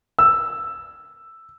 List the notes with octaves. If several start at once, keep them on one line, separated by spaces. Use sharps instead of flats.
E6